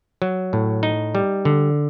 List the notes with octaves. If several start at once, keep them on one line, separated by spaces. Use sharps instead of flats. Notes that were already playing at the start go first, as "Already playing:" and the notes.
F#3
A2
D#4
G3
D3